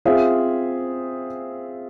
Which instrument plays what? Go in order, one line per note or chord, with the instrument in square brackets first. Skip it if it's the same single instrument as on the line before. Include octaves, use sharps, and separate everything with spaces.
[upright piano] C4 F4 G#4 E5